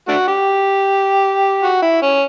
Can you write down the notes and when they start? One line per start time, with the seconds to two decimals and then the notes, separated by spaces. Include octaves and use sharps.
0.08 A3 D4 F#4
0.28 G4
1.63 F#4
1.82 E4
2.02 C#4